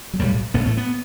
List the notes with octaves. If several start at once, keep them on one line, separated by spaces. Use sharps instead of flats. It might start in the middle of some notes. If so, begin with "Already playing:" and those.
F#3
B1 A2 G3
A1 A2 B3
A3
B3